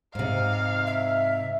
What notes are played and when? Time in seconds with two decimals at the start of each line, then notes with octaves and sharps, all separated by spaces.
0.15 G#2 C3 F5
0.87 E5